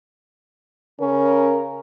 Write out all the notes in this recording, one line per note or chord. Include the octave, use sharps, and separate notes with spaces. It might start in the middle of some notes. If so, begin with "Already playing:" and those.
C#3 C#4 A#4